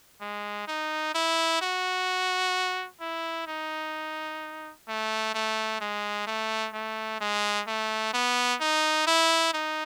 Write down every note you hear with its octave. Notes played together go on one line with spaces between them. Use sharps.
G#3
D#4
E4
F#4
E4
D#4
A3
A3
G#3
A3
A3
G#3
A3
B3
D#4
E4
D#4